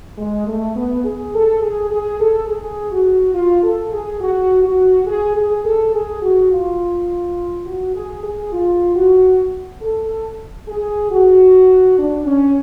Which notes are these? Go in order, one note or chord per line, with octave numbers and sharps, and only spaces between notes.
G#3
A3
B3
G#4
A4
G#4
G#4
A4
G#4
F#4
F4
A4
G#4
F#4
F#4
G#4
G#4
A4
G#4
F#4
F4
F#4
G#4
G#4
F4
F#4
A4
G#4
F#4
D4
C#4